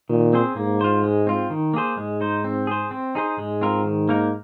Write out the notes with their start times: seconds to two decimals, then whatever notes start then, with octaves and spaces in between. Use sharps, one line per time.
0.09 A#2 D#3
0.33 C4 G#4 C5
0.56 G#2 A#3
0.81 F4 C5
1.03 G#3
1.27 C4 F4
1.50 D#3
1.74 A#3 G#4 C5
1.97 G#2 G#3
2.21 D#4 C5
2.44 C4
2.67 G#4 C5
2.91 C4
3.15 D#4 G#4 C5
3.38 G#2 G#3
3.61 C4 F4 A#4
3.85 D#3
4.09 A#3 D#4 A#4